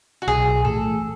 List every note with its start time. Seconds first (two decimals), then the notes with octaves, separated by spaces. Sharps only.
0.22 F#4
0.27 B1 G#4
0.65 A2 E3 A3 A4